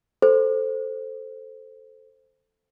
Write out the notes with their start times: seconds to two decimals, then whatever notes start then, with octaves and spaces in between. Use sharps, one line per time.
0.22 A4 C5